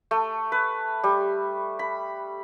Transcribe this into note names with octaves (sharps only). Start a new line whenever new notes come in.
A3
B4
G3
B5